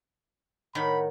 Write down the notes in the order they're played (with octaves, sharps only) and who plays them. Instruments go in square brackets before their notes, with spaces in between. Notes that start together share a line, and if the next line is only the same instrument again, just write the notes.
[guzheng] A2 D#3 [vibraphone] A#4 C#5 F#5 [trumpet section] B5